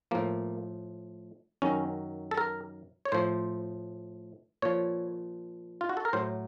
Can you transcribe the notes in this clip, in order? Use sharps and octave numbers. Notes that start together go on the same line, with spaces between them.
A2 F3 A#3
F#2 D#3 F#3 C#4
A4
A#4
C#5
A2 F3 C5
A#2 F3 C#5
F4
F#4
A4
A#4
A2 F#3 C5